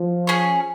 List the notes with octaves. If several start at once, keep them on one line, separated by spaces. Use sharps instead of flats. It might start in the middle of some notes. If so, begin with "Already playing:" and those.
Already playing: F3
C#4 G#4 C#5